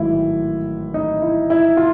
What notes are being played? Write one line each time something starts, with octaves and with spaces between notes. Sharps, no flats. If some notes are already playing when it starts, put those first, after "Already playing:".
Already playing: A1 G#2 D#3 F#3 E4
D#4
E4
E4
F4